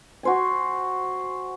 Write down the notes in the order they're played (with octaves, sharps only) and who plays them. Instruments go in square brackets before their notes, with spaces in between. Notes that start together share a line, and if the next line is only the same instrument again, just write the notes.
[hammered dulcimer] F#4 C5 G#5